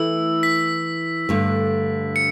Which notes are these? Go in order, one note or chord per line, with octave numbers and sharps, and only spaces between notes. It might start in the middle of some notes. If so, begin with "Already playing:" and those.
Already playing: E3 A3 E4 E6
B6
G2 D3 A3
C#7